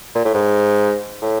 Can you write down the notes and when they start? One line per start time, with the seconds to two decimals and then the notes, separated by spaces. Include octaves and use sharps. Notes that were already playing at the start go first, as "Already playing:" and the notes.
0.15 A#2
0.25 A2
0.34 G#2
1.22 A2